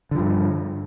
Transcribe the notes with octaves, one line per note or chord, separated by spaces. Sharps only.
G2 D3 F3